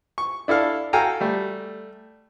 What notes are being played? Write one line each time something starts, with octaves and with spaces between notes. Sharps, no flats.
C#6
D4 E4 A4 F5
F#4 A4 F5 G5 G#5 A#5
G3 A3